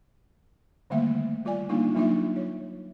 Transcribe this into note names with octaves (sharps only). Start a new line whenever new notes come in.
D3 D#3 G3 A3 A#3 E5
G3 F4 D5 G#5
G3 A#3 D4 D#4 F4
F#3 A#3 D4 D#4 F4 E5
C#5